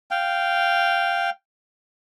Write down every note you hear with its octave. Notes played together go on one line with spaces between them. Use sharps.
F5 G5